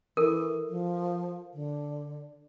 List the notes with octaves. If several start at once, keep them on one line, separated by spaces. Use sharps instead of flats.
E3 A4 A#4
F3
D3